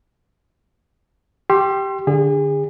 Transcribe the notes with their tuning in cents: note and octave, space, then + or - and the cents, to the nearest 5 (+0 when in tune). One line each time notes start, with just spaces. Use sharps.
G4 -5 C6 +20 E6 +40
D3 +0 G#4 -35